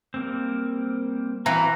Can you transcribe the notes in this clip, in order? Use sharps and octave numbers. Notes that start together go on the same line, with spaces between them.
G3 A#3 C4
E3 C4 F#4 A#5